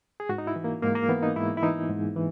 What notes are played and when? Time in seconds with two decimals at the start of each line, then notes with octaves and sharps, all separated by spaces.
0.20 G#4
0.29 G#2 F#4
0.38 D#4
0.47 E4
0.56 E3
0.64 A#3
0.82 G#2 A#3
0.95 A#3
1.09 E3 B3
1.23 D#4
1.36 G#2 E4
1.57 E4
1.62 E3 D#4
1.89 G#2
2.16 E3